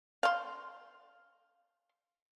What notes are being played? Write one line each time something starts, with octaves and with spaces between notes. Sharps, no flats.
F5 C6